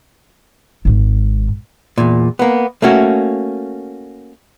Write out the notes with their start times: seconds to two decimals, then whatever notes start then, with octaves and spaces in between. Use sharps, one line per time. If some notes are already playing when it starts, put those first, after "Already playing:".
0.85 G#1 G#2
1.98 E2 A#2
2.39 A#3 B3
2.82 A3 A#3 C#4 F#4